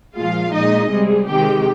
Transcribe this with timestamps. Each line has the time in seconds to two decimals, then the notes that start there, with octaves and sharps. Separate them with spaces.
0.16 A#2 F3 G#3 F4 F5
0.54 A#2 G#3 D#4 D#5
0.91 C3 G3 G#3 G#4
1.28 C3 D#3 G#3 G4 G5